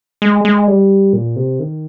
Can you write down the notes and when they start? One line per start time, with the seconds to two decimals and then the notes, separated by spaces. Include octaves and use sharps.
0.22 G#3
0.45 G#3
0.68 G3
1.13 A#2
1.36 C3
1.60 D#3